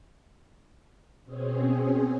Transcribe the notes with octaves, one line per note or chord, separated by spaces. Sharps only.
B2 C4 C#4 G#4